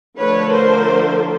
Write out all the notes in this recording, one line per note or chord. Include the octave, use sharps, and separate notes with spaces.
D3 F3 A3 B4 C#5
A#4 C5